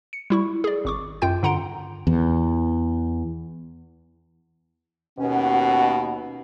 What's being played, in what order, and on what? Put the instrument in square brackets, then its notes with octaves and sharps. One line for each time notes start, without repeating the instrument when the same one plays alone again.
[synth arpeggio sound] C#7
G3 E4 C#6
G#4 D5
G#1 C#6 D6
F#2 F4 G5 G6
G2 D3 F#5 A#5 C6 D7
[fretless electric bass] E2
[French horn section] D#2 B2 [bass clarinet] C#4 [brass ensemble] F#5